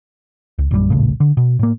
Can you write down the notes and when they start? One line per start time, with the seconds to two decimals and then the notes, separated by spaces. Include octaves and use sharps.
0.59 C#2
0.71 A#1 F#2 F#3 G3
0.90 D#1 A#1 A2 C#3
1.20 D3
1.37 B2
1.59 A2 A#3